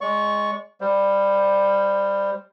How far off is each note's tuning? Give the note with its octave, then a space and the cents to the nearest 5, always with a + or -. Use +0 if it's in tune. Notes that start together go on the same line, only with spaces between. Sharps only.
G#3 +0 D5 -30 C#6 +0
G3 +15 C5 +0